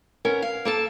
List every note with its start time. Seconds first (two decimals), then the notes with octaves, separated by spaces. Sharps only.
0.25 B3 C#4 A#4
0.42 F5
0.65 A#3 A4 A5